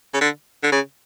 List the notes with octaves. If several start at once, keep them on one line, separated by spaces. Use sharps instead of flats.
C#3
D3
D3
C#3